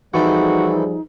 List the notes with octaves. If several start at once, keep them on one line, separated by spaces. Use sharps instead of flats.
E3 F3 G3 C4 D#4 F#4 G#4 A4